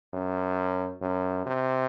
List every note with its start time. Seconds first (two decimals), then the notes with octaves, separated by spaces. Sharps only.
0.13 F#2
1.01 F#2
1.46 C3